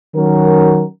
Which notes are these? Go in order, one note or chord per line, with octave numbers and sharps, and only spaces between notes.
D#3 F#3 C#4 F#4 A#4